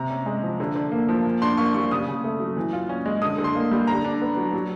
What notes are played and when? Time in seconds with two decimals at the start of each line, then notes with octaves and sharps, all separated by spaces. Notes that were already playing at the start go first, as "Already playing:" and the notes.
Already playing: C3 A#5
0.10 C#4
0.26 G#3
0.43 F3
0.60 D3
0.76 D3
0.92 A#3
1.09 F3
1.25 A#2
1.42 D4 C6
1.57 A#3 C#6
1.74 G3 C#6
1.91 C#3 D#6
2.08 C#3
2.24 A3
2.40 F#3
2.57 E3
2.73 F4
2.89 C#4
3.06 G#3
3.22 D3 D#6
3.38 D3
3.44 C6
3.55 A#3
3.71 G3
3.87 D3 A#5
4.05 D4
4.21 B3
4.37 F#3
4.53 F#3